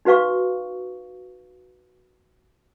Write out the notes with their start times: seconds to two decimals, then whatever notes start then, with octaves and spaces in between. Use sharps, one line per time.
0.05 D#4 F#4 B4 F5 C#6